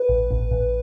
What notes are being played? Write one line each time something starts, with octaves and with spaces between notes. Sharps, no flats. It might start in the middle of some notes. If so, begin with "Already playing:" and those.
Already playing: B4
A1
A1
A1